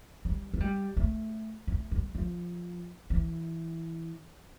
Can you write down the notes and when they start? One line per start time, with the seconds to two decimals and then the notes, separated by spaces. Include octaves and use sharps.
0.25 G3
0.54 A3
0.60 G3
0.97 A3
1.67 A3
1.91 G3
2.15 F3
3.10 E3